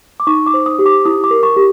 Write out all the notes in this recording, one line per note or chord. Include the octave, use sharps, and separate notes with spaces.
D6
D#4 C#6
D6
C5
D#6
G4
D6
E4 D#6
D6
A#4
C#6
G4